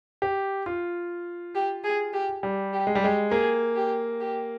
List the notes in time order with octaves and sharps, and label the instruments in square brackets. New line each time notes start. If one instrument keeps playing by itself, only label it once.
[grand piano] G4
F4
[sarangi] G4
G#4
G4
[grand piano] G3
[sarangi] G4
[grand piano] G#3
G3
[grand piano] G#3 [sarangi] G4
[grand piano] A#3 [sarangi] G#4
[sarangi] G4
G4